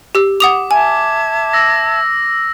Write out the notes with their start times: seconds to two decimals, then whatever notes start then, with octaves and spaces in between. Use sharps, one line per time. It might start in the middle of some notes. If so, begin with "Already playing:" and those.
0.15 G4 E6
0.40 F#5 D6 D#6 F7
0.71 E5 G#5 A5 G#6
1.53 E6 A#6